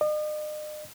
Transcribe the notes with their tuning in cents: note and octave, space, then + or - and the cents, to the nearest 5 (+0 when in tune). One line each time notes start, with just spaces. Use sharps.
D#5 -40